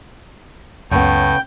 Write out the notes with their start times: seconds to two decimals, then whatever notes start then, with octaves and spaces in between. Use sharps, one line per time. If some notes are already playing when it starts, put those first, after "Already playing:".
0.91 C#2 F#2 A2 C#3 B3 G5